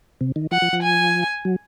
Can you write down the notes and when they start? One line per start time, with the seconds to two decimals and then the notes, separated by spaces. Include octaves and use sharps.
0.21 C3
0.36 D#3
0.51 F3 F#5
0.62 F3
0.73 F3
0.82 G#5
1.45 F#3